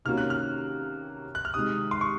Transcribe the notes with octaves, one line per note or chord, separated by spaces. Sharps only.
C3 D#3 A#3 C#4 F#4 F6
F#6
F6
F#6
F6
C3 D#3 G#3 D#6
C6
C#6